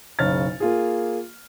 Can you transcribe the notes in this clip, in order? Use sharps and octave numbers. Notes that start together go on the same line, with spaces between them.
F#1 B1 C#3 C#5 F6 A6
A#3 F4 G#4